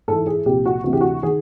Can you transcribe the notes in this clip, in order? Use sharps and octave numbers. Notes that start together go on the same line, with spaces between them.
G#2 E3 A4
G#4
C2 A#2 F3 G4
F#4
D2 C3 E3 F#4
G4
F#4
D#3 G#4